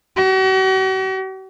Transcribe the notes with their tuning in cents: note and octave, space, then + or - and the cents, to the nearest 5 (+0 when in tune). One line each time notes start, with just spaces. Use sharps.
F#4 +45